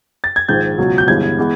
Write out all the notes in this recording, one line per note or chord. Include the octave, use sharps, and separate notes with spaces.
A6
G#6
A#1 G#2 D#3 G#3 G6
C#2 B2 F#3
G6
G1 G2 E3 G#3 B3 G#6
E3 G#3 B3